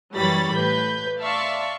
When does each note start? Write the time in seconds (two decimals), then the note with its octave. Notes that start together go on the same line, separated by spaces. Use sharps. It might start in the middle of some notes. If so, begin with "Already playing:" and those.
0.14 F#2 E3 G3 C#5 B5 A6
0.54 A2 B4 G6
1.19 D5 E5 F5 A5 C6 C#6